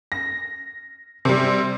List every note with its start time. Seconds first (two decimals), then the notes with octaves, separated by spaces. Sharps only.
0.12 A#6
1.25 C3 G3